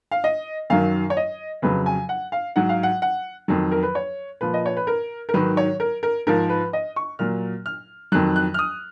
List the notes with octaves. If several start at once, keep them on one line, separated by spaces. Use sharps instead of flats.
F5
D#5
F#2 D#3 F#3 F5
C#5
D#5
F2 C#3 F#3 B4
G#5
F#5
F5
G#2 F#3 F#5
F5
F#5
F#5
F2 D#3 F#3
A#4
B4
C#5
A#2 F3 B4
D#5
C#5
B4
A#4
A#4
G#2 D#3 F#3 B4
C#5
A#4
A#4
G#2 F3 A#4
B4
D#5
C#6
A#2 F#3 F6
F6
F2 D#3 F#3 F#6
F#6
F6
D#6